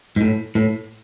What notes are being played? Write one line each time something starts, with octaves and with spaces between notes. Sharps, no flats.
G#2
A2
A2